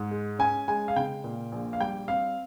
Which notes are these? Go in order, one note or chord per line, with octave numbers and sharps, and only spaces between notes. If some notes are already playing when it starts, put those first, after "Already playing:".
Already playing: G#2
G#3
C#4 G#5
G#3 G#5
F5
C#3 G5
A#2
A#1
F5
G3 G5
C4 F5